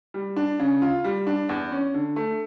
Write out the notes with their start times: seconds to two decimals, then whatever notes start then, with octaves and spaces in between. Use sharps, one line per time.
0.14 G3
0.36 D4
0.59 C#3
0.82 F4
1.04 G3
1.27 D4
1.49 E2
1.72 C#4
1.94 D3
2.16 A3